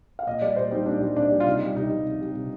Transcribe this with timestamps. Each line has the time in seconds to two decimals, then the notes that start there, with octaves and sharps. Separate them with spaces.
0.19 F5
0.27 A#2 D#5
0.41 G3 D5
0.56 A#2 C5
0.71 G3 D#4
0.86 A#2 D4
1.01 G3
1.16 A#2 D4
1.31 G3
1.40 F4
1.46 C3 D#4
1.61 G3
1.76 C3 D#4
1.91 G3
2.06 C3
2.21 G3
2.35 C3